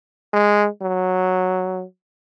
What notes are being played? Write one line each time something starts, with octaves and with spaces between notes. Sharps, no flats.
G#3
F#3